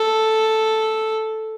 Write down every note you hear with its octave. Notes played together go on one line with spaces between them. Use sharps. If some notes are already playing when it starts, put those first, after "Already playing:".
Already playing: A4